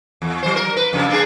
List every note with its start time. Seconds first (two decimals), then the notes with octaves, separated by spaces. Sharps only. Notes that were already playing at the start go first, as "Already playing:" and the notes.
0.22 E2
0.43 F#3 C5
0.56 A#4
0.77 B4
0.93 F2 C#3 G3
1.09 A#3 D4 G#4